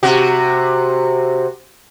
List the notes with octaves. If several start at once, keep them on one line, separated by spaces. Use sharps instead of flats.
C3 F#4